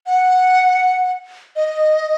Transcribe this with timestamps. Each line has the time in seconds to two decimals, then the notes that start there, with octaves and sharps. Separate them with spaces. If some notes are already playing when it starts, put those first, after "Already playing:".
0.06 F#5
1.56 D#5